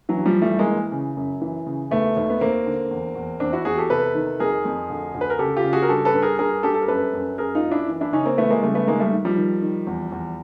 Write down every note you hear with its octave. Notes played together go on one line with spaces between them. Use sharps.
E3 F#3
G2
F3 G3
E3 G3 A3
G#3 A#3
E3
C#3
F#2
E3
C#3
D#2 A3 B3
D#2
B3
D#2 A#3 C4
D3
E2
E2
E2 C4 D4
E4 F#4
E2 F#4 G#4
G4 A4
C3 A4 B4
D#3
F2 G#4 A#4
F2
D2
D2
B4
A#4
C#3 G4 A4
F4 G4
C#3
F#4 G#4
A#4
G2 G4 A4
A4 B4
G2
G#4 A#4
G2 G#4 A#4
G2 G4 A4
A4
A#4
F#2 A4 B4
F#2
F#2 G#4 A#4
D#4 F4
F#2
D4 E4
E3
D4 E4
C#3 C#4 D#4
A#3 C4
E3 A3 B3
G#3 A#3
C#3 G3 A3
A3 B3
D#3 G#3 A#3
G3 A3
D#3
F3 G3
D#3
D#3
E2
E2